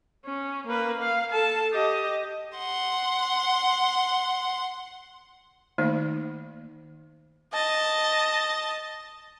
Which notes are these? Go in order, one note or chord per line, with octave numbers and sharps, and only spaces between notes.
C#4
A#3 B4
F5
A4 A5
G4 D#5
F#5 C6
D#3 A3 A#3 D#4 C5 D5
D#5 A5